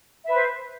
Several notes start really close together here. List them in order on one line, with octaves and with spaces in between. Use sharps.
E5 B4 C5